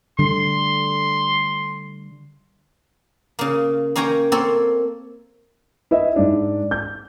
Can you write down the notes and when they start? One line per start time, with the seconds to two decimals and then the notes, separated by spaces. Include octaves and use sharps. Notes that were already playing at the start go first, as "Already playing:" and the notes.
0.19 D3 G3 C6
3.39 C#3 A#3
3.96 A#3 C#4 C#5 G5 A#5
4.32 A#3 C4 A4 C#5
5.91 E4 B4 D#5 E5
6.16 G#2 D4
6.71 G6